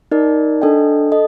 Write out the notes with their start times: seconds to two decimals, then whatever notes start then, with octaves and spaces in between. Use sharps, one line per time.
0.12 D#4 A#4 D5
0.62 D4 A4 D#5 G5
1.12 A4 D#5